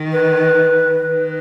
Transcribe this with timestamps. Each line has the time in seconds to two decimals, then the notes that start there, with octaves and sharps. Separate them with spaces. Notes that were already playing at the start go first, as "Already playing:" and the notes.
Already playing: D#3
0.12 B4
1.03 D#3